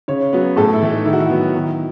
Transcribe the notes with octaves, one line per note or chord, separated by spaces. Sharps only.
C#3 C#5
F#3 B3
A2 A4
E4
E3 A3
D#4
D#3 E4
F#4
E4
F#3 B3
D#3